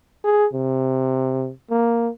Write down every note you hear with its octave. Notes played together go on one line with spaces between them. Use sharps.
G#4
C3
A#3